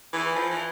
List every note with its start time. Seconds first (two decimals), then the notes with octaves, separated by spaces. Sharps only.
0.13 E3
0.36 F3
0.51 E3